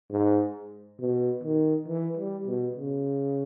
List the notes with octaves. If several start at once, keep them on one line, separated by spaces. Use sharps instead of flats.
G#2
B2
D#3
E3
G3
B2
C#3